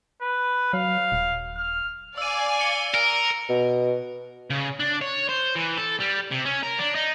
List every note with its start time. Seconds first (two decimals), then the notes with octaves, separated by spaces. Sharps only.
0.22 B4
0.73 F#3 F5
1.12 D#1
1.57 F6
2.18 D5 F5 G#5 E6 D#7
2.61 C#7 G7
2.94 A#4
3.49 B2
4.50 C#3
4.80 D4
5.01 C#5
5.29 C5
5.56 E3
5.78 A4
6.00 G3
6.31 C3
6.45 C#4
6.63 A#4
6.79 D4
6.95 D#4